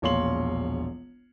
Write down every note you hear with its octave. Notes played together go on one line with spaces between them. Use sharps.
E1 A#1 C#5 F5 C6 F#7